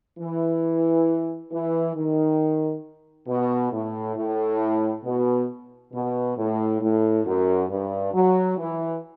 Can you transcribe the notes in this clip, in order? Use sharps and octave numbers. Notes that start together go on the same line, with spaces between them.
E3
E3
D#3
B2
A2
A2
B2
B2
A2
A2
F#2
G2
F#3
E3